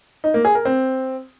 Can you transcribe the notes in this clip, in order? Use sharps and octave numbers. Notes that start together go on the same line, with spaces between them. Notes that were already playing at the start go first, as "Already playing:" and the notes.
D#4
A#3
G#4
A#4
C4